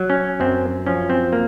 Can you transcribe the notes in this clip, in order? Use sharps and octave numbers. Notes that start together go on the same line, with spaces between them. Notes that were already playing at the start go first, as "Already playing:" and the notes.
Already playing: F#3
C#4
F#2 C4
F3 C#4
C4
A#3